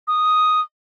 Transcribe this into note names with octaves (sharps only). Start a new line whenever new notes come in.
D#6